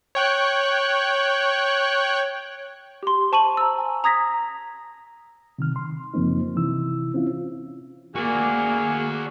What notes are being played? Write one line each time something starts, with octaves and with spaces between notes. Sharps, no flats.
C#5 G5 F#6
G4 C6
C5 A5 C#6 D#7 F#7
A#5 E6
G#5
A#5 D#6 G#6 A#6 B6
C3 D#3 F6
C6
F#2 C#3 F3 A#3 C4 D#4
C3 E3 E4 E6
C4 C#4 E4 F4
A#3 F#4 G#4 D5